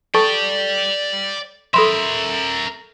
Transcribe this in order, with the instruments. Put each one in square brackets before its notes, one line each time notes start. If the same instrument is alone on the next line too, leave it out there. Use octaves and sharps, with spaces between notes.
[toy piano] A4 A5 C#6 [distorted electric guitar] D5 G5
[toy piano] A4 B5 C6 [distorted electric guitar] A#4 E5